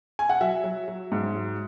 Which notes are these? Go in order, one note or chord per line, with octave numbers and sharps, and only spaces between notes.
G#5
F#5
F#3 E5
F#3
F#3
G#2
F#3